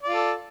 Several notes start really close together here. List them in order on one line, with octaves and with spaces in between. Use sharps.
D5 F4 A4